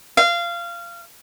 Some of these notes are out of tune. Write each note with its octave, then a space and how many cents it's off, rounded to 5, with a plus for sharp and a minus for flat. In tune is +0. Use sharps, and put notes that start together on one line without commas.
F5 -20